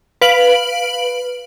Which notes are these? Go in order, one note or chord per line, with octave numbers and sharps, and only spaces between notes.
B4 F5 D7 F#7